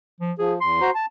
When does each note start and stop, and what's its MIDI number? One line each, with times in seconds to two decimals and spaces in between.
0.21 0.32 53
0.39 0.59 53
0.39 0.53 68
0.61 0.80 40
0.61 0.90 84
0.81 0.90 66
0.81 0.90 72
0.81 0.90 82
0.95 1.06 81